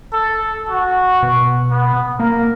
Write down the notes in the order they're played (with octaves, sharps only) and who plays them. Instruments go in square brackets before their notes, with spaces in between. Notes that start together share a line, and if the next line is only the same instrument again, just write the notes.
[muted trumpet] A4
F#4
[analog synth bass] B2
[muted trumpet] B3
[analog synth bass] A#3 [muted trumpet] A#4